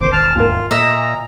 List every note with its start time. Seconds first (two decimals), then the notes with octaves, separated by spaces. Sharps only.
0.01 E1 A1 E2 D#3 C5 D6
0.13 A5 F6
0.36 D#2 G#2 F4 A#4
0.71 A#2 D#5 E5 A#5